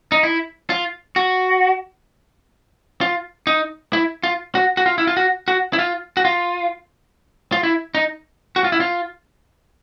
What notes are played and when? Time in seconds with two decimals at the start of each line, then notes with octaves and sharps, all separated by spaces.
0.12 D#4
0.23 E4
0.70 F4
1.16 F#4
3.01 F4
3.47 D#4
3.93 E4
4.23 F4
4.55 F#4
4.77 F#4
4.86 F4
4.98 E4
5.07 F4
5.17 F#4
5.48 F#4
5.73 E4
5.79 F4
6.17 F#4
6.25 F4
7.52 F4
7.63 E4
7.95 D#4
8.56 F#4
8.64 F4
8.72 E4
8.80 F4